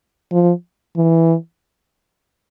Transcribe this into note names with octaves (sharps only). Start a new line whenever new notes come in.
F3
E3